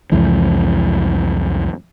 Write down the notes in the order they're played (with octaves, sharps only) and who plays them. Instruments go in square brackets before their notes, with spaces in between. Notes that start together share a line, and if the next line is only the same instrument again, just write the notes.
[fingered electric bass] C2 F2 E3 G#3